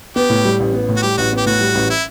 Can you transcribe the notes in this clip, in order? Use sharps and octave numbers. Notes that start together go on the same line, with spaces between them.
B3 G4
A2
G3
A1
B3
A2
F#4
G3 G4
A1 F#4
B3 G4
A2 F#4
G3
A1
E4